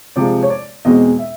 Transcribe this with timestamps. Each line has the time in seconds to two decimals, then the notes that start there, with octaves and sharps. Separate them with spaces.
0.16 C3 F3 G#3 D5
0.43 C#5
0.50 D5
0.85 E2 B2 G#3 C4 D#5
1.19 E5